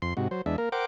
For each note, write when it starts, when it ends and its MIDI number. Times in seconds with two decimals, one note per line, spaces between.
0.02 0.14 41
0.02 0.14 84
0.17 0.28 44
0.17 0.28 48
0.17 0.28 66
0.31 0.42 54
0.31 0.42 72
0.46 0.56 40
0.46 0.56 56
0.46 0.56 62
0.46 0.56 76
0.58 0.69 58
0.58 0.69 70
0.72 0.86 70
0.72 0.86 72
0.72 0.86 78
0.72 0.86 79
0.72 0.86 86